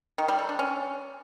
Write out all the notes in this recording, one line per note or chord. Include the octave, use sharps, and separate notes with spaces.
D#3
G3
A4
D4
C#4